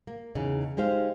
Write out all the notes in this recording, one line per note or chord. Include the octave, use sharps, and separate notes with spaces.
A#3
E2 C#3 D#4
G#3 D#4 G4 C5 F5